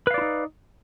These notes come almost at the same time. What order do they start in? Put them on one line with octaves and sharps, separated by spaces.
B4 F5 D5 E4 D#4